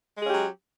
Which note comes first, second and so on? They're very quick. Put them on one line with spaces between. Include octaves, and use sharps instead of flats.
G#3 G#4 C#4 G4 F#3